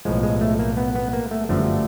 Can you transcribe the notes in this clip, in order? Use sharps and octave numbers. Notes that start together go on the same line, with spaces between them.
B1 A2 F3 G#3
G#3
A3
A#3
B3
B3
A#3
A3
G1 F#2 D3 F3 A3